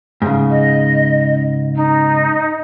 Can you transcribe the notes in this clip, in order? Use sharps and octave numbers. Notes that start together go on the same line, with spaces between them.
G#2 C#3
D#5
D#4